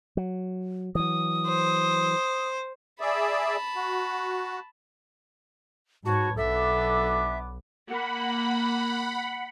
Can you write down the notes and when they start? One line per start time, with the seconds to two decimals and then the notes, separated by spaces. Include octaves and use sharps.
0.17 F#3
0.95 E3 F#3 D#6
1.48 C5
3.01 G#4 D5 E5 A5 B5
3.76 F#4
6.05 G#2 F#4 B4 C#5 A5
6.37 B1 B3 D4 A4 E5 D6
7.89 A#3 F#5 B5